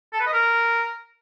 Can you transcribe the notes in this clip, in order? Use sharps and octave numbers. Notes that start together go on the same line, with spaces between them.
A4
B4
D#5
A#4